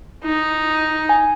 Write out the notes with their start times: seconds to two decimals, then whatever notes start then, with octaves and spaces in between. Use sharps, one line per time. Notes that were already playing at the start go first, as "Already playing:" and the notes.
0.24 D#4
1.09 G#5